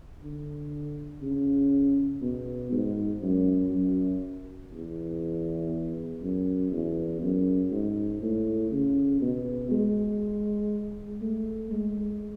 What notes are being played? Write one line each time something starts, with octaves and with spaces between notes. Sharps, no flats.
D3
C#3
B2
G#2
F#2
F#2
E2
F#2
E2
F#2
G#2
A2
C#3
B2
G#3
A3
G#3